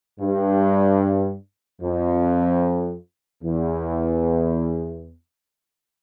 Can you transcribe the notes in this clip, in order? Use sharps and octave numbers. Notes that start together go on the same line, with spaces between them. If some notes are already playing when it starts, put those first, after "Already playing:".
G2
F2
E2